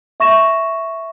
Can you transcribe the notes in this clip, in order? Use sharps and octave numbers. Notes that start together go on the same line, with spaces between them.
E5 C#6 A#6 E7